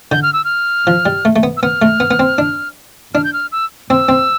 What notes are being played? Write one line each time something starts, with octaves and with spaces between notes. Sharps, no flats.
D3 G6
F6
E6
F6
F3
G3
A3
A3
B3
E6
B3 F6
A3
B3
B3
C4
D4
D4 F6
G6
F6
E6
C4 E6
C4